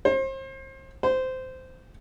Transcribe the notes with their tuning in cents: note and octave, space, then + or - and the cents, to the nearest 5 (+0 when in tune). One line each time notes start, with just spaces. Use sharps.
C5 +35
C5 -15